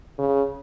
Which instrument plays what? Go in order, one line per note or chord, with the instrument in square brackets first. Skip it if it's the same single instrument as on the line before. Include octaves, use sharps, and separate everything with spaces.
[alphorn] C#3